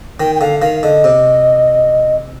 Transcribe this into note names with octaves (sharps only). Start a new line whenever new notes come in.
D#3 G5
G5
D3 F5
D#3 F5
D3 D#5
C3